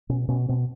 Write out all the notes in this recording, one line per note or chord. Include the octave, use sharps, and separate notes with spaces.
B2 C#4
B2 C#4
B2 C4